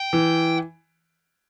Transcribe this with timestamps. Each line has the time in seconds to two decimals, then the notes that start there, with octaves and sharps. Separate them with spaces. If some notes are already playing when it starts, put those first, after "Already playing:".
Already playing: G5
0.13 E3